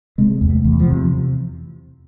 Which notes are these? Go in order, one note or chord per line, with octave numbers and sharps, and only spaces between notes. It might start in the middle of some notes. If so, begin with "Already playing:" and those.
C3 G#3
E2
A3
E2
F3
C3